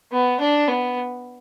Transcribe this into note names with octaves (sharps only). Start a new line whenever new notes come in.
B3
D4
B3